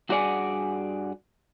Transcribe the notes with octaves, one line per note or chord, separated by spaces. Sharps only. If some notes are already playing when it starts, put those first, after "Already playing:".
G2 F#4 G#4 D5 F#5 G#5